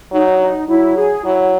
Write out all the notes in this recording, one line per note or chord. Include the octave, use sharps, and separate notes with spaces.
F#3 D#4
D#4
F#3 E4
G#4
F#3 E4